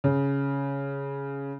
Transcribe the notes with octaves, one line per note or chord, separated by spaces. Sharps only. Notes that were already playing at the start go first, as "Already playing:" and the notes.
C#3